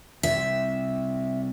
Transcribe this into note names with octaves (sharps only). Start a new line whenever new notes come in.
C2 E5